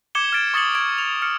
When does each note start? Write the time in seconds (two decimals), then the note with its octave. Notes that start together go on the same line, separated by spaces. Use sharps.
0.15 D6 G#6 C#7 E7 G7
0.32 F6 G#6 A6 D7
0.54 C#6 D#6 A6 C#7 F#7 G7
0.75 C#6 G#6 D7
0.98 F7
1.22 F6 C#7